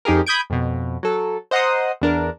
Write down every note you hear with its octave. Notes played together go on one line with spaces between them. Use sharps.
F2 D#4 G4 G#4 A#4
B5 D#6 G6 G#6 D7
F2 B2
F#3 A4
C5 D#5 F#5 A#5 C6 D#6
E2 D4 A#4